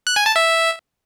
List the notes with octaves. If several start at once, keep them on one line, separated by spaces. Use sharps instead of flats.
F#6
G#5
A5
E5